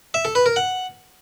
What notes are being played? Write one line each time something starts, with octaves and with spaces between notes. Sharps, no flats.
E5
A4
B4
A#4
F#5